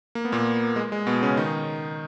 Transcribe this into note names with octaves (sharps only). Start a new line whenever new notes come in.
A#3
B3
A#2 A#3
G#3
G#3
B2 B3
C#3 C#4
D#3 D#4